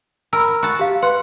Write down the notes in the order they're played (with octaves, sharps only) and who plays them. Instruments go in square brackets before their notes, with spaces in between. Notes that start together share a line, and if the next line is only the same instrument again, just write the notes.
[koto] A#4 [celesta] B5 E6
[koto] F#4 A5
[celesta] G4 F5
[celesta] B4 C6 [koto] F#5